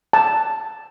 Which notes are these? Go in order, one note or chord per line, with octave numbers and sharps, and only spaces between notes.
A5